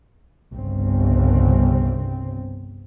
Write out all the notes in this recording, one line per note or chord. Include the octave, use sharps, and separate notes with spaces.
G1 C2 C#3 C4